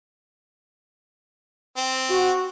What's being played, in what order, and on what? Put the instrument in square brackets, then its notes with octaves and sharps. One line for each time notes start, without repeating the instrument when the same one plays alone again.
[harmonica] C4
[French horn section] F#4